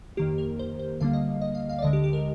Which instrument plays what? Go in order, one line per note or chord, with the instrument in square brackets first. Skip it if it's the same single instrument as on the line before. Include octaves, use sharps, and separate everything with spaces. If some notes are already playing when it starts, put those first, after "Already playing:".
[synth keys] F2 D#3 A#3 G4
A#4
C5
C5
D2 D3 G3 A#3 F5
D#5
D#5
F5
F5
D5
D2 D3 G#3 D#5
G4
G4
A#4